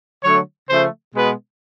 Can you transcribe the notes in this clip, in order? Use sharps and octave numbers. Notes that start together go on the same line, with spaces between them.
D3 F#3 A3 C#5
C#3 F3 A3 C5
B2 G#3 B3 B4